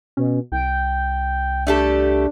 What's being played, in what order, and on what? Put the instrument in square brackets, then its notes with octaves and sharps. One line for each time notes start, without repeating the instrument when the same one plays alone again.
[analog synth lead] B2 [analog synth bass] C#4
[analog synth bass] C2 [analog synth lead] G5
[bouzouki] A3 G4 A4 [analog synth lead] D4